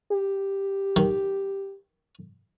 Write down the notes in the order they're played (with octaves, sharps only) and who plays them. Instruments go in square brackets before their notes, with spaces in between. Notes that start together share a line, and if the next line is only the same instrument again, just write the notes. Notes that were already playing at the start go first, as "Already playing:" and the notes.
[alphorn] G4
[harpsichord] D#3